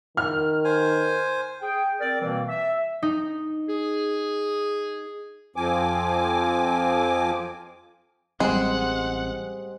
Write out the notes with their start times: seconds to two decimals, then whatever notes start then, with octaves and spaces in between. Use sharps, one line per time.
0.17 D#3 F6
0.65 C5 G#5
1.62 G#4 G5
2.01 C4 A#4 D5
2.21 B2 E3 G3 A#3 C4
2.49 E5
3.02 D#4
3.69 G#4
5.56 F2 F3 C4 G#5 D6
8.40 A1 G3 G#3 C4 C5 F#5